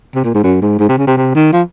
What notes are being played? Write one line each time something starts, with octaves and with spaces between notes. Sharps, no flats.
C3
A#2
G#2
F#2
G#2
G#2
C3
C#3
C3
C3
D#3
F3